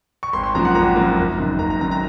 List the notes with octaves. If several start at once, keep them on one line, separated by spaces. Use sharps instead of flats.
C#6
G#1 C6
C6
F#2 F3 A#3 A#5
F#5
G#1 A#5
F#2 F3 A#3
F#1
F#2 D#3
F#1 A#5
A#5
F#2 D#3 A#5
A#5